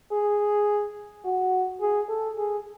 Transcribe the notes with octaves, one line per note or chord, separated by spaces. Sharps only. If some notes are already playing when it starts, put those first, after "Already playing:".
G#4
F#4
G#4
A4
G#4